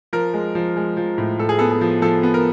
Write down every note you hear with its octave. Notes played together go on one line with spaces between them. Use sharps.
F3 A#4
G#3
F3
G#3
F3
A2
A2 A4
G#4
B3 A4
G#4
F3
F3 A4
B3
A#4